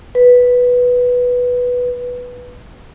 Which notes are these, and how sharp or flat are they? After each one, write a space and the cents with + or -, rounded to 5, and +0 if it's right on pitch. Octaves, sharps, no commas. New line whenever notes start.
B4 -5